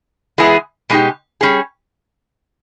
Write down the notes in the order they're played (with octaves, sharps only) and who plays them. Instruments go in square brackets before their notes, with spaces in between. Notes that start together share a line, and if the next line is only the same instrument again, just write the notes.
[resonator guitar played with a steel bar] E3 G#3 B3 E4 G#4
B2 G#3 D#4 G4
G3 C#4 G#4